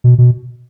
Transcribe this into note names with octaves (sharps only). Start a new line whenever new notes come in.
B2
B2